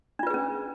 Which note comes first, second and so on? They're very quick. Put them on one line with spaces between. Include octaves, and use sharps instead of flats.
D4 F4 B4 G#4 C#4